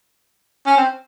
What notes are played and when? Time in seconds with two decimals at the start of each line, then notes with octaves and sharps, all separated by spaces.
0.66 C#4
0.77 C4